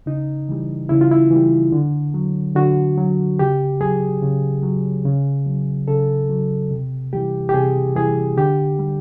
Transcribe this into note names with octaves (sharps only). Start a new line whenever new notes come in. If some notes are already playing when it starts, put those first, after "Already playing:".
C#3 D#4
E3 G3
C#3 E4
F4
E4
E3 G3
D3
F#3
D3 F#4
F#3
C#3 G4
F#3 G#4
C#3
F#3
C#3
F#3
C#3 A4
F#3
C3
E3 G3 G4
G4
C3 G#4
E3 G3 G#4
D3 G4
G3